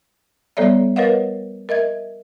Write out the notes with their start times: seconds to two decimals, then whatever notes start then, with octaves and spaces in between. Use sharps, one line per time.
0.57 G3 B3 A4 C#5 D5 E5
0.96 A#4 B4 C#5 D#5 F5 F#5
1.69 A#4 D#5 E5 G#6